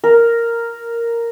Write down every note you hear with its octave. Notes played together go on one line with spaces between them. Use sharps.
A#4